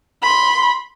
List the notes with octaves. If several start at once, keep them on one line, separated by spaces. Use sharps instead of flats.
B5 C6